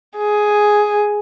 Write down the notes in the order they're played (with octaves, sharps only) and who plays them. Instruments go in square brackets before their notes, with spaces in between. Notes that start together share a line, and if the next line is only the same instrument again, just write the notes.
[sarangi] G#4